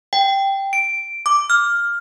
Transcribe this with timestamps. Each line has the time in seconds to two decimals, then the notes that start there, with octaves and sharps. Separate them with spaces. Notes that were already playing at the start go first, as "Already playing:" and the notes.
0.13 G5
0.73 D7
1.26 D6
1.50 F6